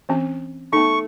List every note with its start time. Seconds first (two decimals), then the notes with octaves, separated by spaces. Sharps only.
0.09 E3 C4 C#4
0.73 A3 B3 D#4 C#6